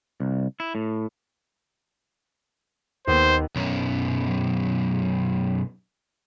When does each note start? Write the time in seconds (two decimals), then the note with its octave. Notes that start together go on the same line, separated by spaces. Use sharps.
0.20 C2
0.60 E4
0.75 A2
3.07 D#2 B3 B4 C5
3.56 B1 F#2